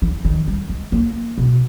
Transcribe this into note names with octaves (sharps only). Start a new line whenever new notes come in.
E3
D#3
G3
G#3
A#3
B2